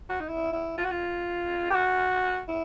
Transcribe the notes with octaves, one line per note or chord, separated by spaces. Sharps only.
F#4
D#4
E4
E4
F4
F#4
F4
G4
F#4
E4